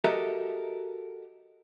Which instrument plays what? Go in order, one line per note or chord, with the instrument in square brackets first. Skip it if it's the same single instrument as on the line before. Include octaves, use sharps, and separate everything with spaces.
[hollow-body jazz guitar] F#4 G4 A4 A#4 D#5 E5